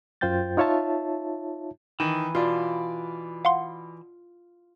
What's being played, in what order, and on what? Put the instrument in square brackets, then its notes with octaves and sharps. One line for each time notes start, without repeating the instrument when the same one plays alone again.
[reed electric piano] F#2 F4 C5 G5 G6 A6
D#4 F4 C#5 E5 A5
[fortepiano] D#3 [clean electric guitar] E3
[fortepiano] B2 D5 [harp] F4
[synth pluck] F5 F#5 C6